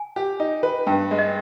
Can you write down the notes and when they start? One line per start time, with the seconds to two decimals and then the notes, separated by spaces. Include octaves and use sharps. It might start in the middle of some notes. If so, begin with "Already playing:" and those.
Already playing: G#5
0.16 G4
0.40 D#4
0.63 B4
0.87 G2 G5
1.11 G#3
1.18 D#5